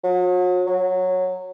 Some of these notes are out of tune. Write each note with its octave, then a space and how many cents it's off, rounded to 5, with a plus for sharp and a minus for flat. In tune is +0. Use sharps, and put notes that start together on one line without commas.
F#3 -40
F#3 -10